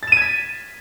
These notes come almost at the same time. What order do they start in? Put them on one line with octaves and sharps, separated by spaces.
A6 E7 D#7 G#6 B6